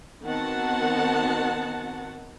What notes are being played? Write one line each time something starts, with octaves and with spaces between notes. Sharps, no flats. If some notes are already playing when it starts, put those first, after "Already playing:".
D#3 B3 C4 F#4 F#5 A5